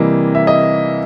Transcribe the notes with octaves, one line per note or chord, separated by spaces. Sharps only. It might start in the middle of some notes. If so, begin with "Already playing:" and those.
Already playing: C3 E3 G3 A#3 D#5
E5
D#5